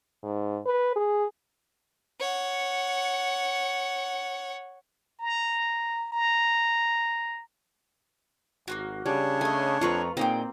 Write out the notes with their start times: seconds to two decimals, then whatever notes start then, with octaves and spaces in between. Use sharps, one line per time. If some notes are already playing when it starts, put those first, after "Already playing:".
0.23 G#2
0.66 B4
0.96 G#4
2.20 C#5 F#5
5.20 A#5
6.12 A#5
8.68 G#1 A#3 C4 F#4
9.06 C#3 G3 D4 C#5
9.41 A3 D#5 G#5
9.81 F2 F4 B4 A#5 C#6
10.17 A#2 A#3 C4 D#4 G#4 G5